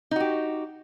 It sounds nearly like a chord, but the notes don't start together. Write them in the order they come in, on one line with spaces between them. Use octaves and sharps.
D#4 F#4 G4